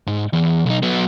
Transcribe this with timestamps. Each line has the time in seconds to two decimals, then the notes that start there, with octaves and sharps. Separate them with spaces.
0.07 G#2
0.33 E2
0.66 B1 D#4
0.83 F#3 B3